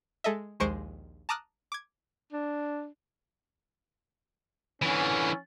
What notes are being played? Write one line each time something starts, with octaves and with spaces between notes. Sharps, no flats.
G#3 A4 D#5 E5
A#1 D#2 G#3 C5 C#6 D7
A5 A#5 D6 D#6 F6 F#6
D6 G#6
D4
D3 E3 C#4